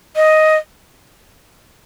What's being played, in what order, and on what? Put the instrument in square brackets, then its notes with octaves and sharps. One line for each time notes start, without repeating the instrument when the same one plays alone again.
[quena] D#5